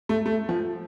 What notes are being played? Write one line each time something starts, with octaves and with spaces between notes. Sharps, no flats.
A3
A3
F3